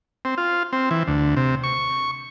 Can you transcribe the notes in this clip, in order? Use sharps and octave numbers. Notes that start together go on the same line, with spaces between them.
C4
F4
C4
E3
D2
C3
C#6